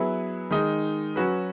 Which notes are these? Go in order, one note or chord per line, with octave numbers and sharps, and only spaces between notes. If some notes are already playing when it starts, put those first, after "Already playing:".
Already playing: F#3 B3 E4 G#4 B4
D#3 G#3 D#4
F#3 C#4 F#4 B4